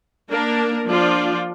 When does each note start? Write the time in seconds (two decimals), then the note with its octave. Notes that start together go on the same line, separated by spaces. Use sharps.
0.30 A#3 D4 A#4
0.87 F3 A#3 D4 F4 D5